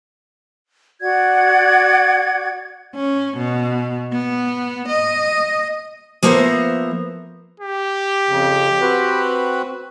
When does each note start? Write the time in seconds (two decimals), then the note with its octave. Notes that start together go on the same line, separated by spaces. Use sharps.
1.02 F#4 D5 F#5 G#6
2.95 C#4
3.37 B2
4.13 B3
4.88 D#5
6.23 F3 A#3 B3 A#4 C5 E5
7.60 G4
8.28 F2 C#3
8.81 C4 F#4 B4